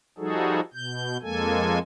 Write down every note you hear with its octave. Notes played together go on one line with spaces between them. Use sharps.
F3 G3 D#4 F#4 G#4 A4
B2 G6
F2 G#3 A#3 A4 G#5